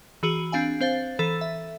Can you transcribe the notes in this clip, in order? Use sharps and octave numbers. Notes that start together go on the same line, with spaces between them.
E3 F#4 G#4 F#7
C4 D4 F5 G#5
C4 C5 F5 A6
E3 A4 A6 B6
E5